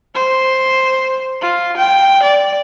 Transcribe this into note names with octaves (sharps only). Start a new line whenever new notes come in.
C5
F4
G5
D5